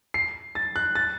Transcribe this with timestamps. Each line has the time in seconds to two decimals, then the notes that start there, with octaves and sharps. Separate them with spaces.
0.14 C7
0.55 A6
0.76 F#6
0.95 A6